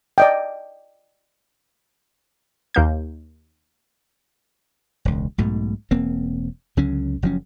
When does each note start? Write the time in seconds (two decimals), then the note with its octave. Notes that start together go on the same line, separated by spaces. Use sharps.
0.18 D5 D#5 G5
2.74 D#2 A#3 G6
5.05 E1 C#2
5.38 B1 G#2 B2 A3
5.91 E1 A#3 C4
6.77 C#2 D3 F#3 C#4
7.22 F#1 F3 F#3 C#4